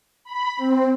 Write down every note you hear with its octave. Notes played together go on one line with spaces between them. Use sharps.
B5
C4